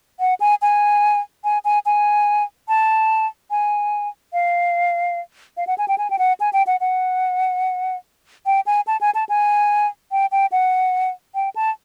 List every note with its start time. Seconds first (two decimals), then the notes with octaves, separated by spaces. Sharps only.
0.20 F#5
0.40 G#5
0.62 G#5
1.44 G#5
1.65 G#5
1.86 G#5
2.68 A5
3.51 G#5
4.33 F5
5.57 F5
5.67 F#5
5.78 G#5
5.88 G5
5.98 G#5
6.10 G5
6.19 F#5
6.40 G#5
6.53 G5
6.67 F#5
6.81 F#5
8.46 G5
8.66 G#5
8.87 A5
9.01 G#5
9.15 A5
9.29 G#5
10.12 G5
10.32 G5
10.52 F#5
11.35 G5
11.56 A5